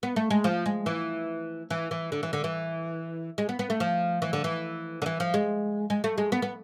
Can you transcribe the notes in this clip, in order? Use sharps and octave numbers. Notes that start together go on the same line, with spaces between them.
B3
A3
G#3
F3
G#3
E3
E3
E3
D3
E3
D3
E3
G#3
B3
B3
A3
F3
E3
D3
E3
D3
E3
F3
G#3
G#3
A3
G#3
B3
B3